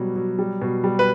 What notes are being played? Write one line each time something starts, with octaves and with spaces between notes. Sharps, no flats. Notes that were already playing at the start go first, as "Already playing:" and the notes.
Already playing: B2 F#3 G3
F#3
G3
B2
G3
B4